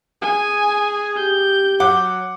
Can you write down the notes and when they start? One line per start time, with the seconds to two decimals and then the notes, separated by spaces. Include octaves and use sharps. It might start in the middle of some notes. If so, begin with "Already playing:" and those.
0.22 G#4 G#5
1.17 G4 G6
1.80 F#3 F#5 D6